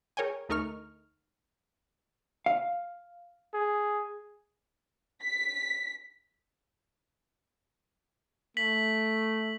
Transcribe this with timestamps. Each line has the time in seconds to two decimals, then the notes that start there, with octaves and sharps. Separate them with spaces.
0.17 G#4 A#4 C#5 G5 G#5
0.49 D2 A3 D#4 A#4 C#6 F6
2.46 F5
3.54 G#4
5.24 B6
8.57 A3 B6 F#7